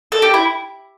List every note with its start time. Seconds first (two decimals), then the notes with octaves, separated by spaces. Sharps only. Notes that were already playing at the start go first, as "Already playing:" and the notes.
0.12 A4
0.22 G4
0.34 E4